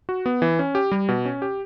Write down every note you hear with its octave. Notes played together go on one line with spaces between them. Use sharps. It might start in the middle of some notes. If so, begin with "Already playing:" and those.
F#4
B3
E3
C#4
G4
G3
B2
C#4
G4